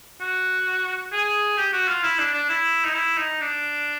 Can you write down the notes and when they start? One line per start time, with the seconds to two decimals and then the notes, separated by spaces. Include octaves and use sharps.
0.21 F#4
1.13 G#4
1.58 G4
1.73 F#4
1.88 F4
2.03 E4
2.19 D4
2.34 D4
2.49 E4
2.85 D#4
2.95 E4
3.18 D#4
3.41 D4